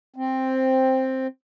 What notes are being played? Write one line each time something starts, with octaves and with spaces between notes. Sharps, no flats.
C4